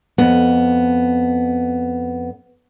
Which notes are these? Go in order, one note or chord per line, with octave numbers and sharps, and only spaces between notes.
F2 B3